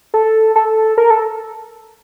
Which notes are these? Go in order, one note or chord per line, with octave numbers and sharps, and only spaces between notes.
A4
A4
A#4
A4